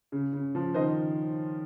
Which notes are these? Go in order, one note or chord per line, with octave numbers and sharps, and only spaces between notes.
C#3
C#3
F3
D#3 C5 D#5